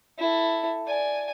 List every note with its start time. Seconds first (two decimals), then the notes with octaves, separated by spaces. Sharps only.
0.18 E4 A4
0.87 D5 G#5